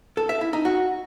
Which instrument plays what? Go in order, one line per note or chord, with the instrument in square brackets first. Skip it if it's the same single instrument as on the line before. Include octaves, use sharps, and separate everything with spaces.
[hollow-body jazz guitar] A4
E5
E4
D#4
F#4